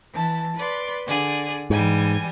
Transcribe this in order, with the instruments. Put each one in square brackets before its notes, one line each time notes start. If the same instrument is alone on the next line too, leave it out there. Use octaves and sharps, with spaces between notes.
[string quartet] E3 A5
B4 D5 C6
D3 G#4 D5
[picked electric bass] G#2 [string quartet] E3 G3 G#5